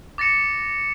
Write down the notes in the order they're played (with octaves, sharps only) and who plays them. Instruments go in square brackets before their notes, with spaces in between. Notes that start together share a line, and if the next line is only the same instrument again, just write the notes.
[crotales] D6 A6 A#6 C#7 E7